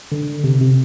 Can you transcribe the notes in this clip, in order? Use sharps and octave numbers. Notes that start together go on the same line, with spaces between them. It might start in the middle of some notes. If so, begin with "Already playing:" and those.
D3
C3
C3